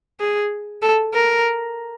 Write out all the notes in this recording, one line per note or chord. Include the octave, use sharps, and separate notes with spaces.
G#4
A4
A#4